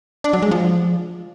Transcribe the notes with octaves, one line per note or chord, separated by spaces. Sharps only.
D4
F#3
G#3
F3